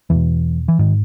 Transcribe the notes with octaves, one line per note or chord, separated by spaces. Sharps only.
E2 B2 E3
E3
G#2 D#3